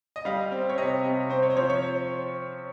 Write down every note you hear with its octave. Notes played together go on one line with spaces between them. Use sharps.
D#5
G3 F5
C4
C#5
C3 D#5
C3
C4 C5
C#5
C5
F3 C#5
C#5